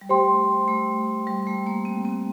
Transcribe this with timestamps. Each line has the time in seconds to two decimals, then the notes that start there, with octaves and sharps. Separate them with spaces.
0.01 G3
0.09 A3 G4 C5 G5 C6
0.68 A3
1.27 G3
1.47 A3
1.67 A#3
1.85 C4
2.05 C4